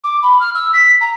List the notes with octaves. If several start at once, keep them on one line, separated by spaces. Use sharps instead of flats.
D6
B5
F6
E6
B6
A#5